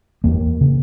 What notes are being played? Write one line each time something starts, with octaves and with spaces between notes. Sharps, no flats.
E2 A#3
C#3